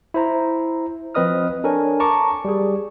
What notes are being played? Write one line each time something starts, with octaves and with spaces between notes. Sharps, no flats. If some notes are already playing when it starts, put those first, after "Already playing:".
E4 C5 A#5
F3 C4 B4 D#5 D#6 F6
D4 A4 A#4 C#5 G#5
A5 A#5 C#6 D6
G3 G#4